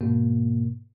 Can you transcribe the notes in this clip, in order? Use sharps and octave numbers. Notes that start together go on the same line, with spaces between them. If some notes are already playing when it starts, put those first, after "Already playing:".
G#2 B2 A#3